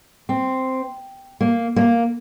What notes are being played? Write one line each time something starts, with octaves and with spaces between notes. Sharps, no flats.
C4
A#3
A#3